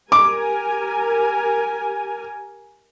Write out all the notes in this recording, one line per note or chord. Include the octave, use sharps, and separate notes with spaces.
G4 A#4 G#5 D6